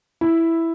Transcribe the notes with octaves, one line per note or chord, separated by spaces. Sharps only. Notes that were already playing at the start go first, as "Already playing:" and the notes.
E4